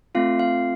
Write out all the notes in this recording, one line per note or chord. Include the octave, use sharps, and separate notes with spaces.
A3 C4 F4 F5
F5